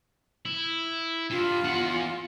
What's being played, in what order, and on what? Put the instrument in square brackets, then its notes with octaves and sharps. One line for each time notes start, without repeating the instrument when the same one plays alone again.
[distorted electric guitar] E4
[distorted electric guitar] G2 [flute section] F4
[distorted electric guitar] E2 F#5